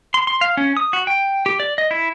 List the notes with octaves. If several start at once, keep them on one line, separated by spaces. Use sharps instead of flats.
C6
C6
F5
C#4
D#6
F#4
G5
G4
D5
D#5
E4